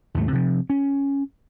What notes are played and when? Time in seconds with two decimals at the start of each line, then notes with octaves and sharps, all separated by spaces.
0.15 D#2 G#2 A3
0.32 C3 F3
0.70 C#4